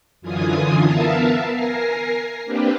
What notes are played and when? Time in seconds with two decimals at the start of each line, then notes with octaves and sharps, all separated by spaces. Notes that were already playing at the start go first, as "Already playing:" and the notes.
0.21 F#2 D3 E3 F4 G#5 D#6
0.82 B3 A#4 E5 F5 A5
1.50 A#4 G#5 A#6 C7
2.45 A#3 C4 D4 G4 B4